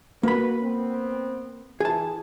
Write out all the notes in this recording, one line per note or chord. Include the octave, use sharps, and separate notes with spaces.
A#3 F#4 B4 B5
B3 C4
E3 G#4 A5